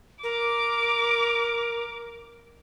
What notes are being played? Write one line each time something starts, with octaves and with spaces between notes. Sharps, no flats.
A#4 D6